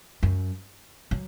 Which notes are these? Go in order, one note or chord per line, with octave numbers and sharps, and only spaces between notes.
F#2
F#3